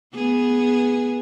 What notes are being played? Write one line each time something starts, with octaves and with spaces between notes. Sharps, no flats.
B3 G#4